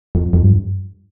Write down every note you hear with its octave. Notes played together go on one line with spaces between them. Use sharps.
F2
F2
G2